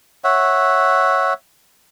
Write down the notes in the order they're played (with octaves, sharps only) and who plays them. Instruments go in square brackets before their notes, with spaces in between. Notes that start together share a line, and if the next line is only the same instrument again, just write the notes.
[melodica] C#5 E5 F#5